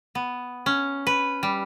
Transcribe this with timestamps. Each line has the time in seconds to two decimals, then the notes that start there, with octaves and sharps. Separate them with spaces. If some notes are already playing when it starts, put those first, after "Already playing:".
0.15 B3
0.66 C#4
1.07 B4
1.43 G3